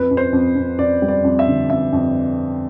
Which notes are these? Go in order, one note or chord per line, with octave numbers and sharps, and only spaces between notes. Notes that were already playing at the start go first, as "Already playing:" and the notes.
Already playing: F2 B4
F2
C5
F2
F2
F2 D5
G3
D5
F2
E5
D3
F2 E5
F2